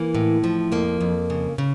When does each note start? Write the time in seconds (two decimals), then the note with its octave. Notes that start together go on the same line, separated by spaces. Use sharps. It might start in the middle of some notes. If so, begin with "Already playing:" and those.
Already playing: E3 A#3
0.15 A2
0.44 F3
0.72 F2 A#3
1.01 F2
1.30 C#3
1.58 C#3